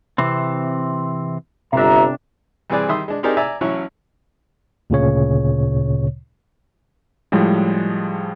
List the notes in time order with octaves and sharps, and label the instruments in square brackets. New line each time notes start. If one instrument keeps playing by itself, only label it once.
[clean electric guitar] C3 E3 C4
[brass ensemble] G1 E5 A#5 [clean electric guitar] C3 D4
[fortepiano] G2 E3 C4 G#4 D5 F#6
D#3 G3 E5 C6 D#6
G#3 D4
C4 D#4 G4 G#4 A#4 D5
D5 E5 G#5 A#5
A1 F#3 C#4 E4 C#6
[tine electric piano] D2 A#2 C#3 C#5
[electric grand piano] A2 F3 G3 G#3